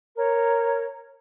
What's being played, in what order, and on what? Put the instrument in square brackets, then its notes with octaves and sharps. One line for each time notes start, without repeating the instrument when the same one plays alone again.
[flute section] A#4 C#5